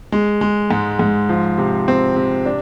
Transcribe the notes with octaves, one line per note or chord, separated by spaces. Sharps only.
G#3
G#3
G#2
G#2
F3
C3
C4
C3
D4